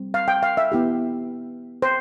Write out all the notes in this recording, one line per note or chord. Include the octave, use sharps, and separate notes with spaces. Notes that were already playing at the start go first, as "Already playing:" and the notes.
Already playing: G3 C4
F5
G5
F5
E5
B3 E4 G4
C5